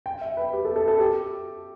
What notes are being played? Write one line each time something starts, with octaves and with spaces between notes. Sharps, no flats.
G5
E5
B4
G4
A4
A4
A4
G4